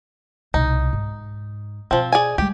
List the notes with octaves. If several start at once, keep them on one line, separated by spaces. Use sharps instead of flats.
C2 B2 D#4
G#2
B2 F3 C4
G#4 D5 G#5
G3 G#3 G4